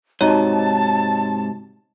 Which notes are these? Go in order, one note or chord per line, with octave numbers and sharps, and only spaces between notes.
G#2 C3 D#4 F#4 C#5 D#5 A5 A#5